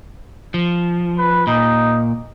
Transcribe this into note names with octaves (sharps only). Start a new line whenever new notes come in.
F3
B4
A#2 D#4